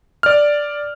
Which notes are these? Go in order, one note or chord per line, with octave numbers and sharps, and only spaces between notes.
D5 F6